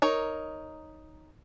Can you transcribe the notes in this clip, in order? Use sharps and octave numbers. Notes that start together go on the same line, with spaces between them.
D#4 A#4 C#5